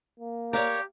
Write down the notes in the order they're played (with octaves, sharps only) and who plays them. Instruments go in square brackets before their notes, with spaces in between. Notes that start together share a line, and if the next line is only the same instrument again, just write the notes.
[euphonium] A#3
[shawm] G4 [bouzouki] A#4 C#5 [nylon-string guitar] D5 F5